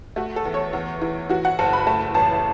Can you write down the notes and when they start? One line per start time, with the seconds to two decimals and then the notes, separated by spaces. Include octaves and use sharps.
0.16 A3 F#4
0.36 A4
0.45 E2
0.54 C#5
0.73 E2
1.02 E3
1.29 E3 F#4
1.45 F#5
1.59 F#1 A5
1.73 B5
1.87 A3 A5
2.14 A1 A5